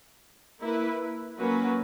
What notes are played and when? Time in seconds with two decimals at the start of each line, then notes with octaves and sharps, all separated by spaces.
0.60 A#3 E4 B4
1.38 F#3 A#3 C#4 F#4 B4